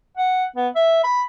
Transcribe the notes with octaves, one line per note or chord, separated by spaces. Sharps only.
F#5
B3
E5
B5